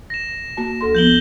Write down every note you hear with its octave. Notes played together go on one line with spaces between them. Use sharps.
A#6 E7
A#3 F#4 A5
D2 A4 C6
F3 B3 G6 F#7 G7